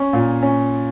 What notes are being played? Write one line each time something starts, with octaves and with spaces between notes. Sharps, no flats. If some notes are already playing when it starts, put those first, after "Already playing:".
Already playing: C#4
A#2
C#4